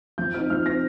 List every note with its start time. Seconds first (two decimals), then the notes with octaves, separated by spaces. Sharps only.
0.18 F3 G6
0.34 C4 D#4 F6
0.50 F3 F6
0.66 C4 D#4 A#6